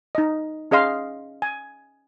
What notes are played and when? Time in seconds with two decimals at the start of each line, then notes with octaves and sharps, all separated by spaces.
0.15 D#4 D#5
0.71 C#4 G#4 D#5 F5 C6
1.42 G#5